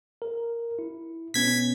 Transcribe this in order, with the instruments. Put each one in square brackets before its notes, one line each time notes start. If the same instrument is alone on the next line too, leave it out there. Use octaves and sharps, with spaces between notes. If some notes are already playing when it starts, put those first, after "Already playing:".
[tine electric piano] A#4
E4
[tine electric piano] B2 B3 C#4 [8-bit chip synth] G#6 B6